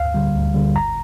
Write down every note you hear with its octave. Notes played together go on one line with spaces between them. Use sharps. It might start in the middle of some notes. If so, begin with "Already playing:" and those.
Already playing: D2 F5
D3 G3
D2
D3 G3
G1 A#5